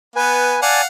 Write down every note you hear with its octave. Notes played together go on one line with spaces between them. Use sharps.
B3 B4 G#5
D5 F5 F#5 G#5 A5